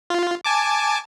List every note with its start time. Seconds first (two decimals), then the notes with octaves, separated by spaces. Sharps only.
0.10 F4
0.45 G#5 A5 D6